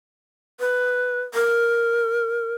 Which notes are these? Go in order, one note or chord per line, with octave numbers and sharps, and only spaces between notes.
B4
A#4